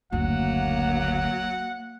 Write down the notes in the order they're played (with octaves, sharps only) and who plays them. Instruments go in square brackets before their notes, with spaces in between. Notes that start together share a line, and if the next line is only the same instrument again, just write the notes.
[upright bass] F#1 D2 [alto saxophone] F#3 [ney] A#3 [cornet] F#5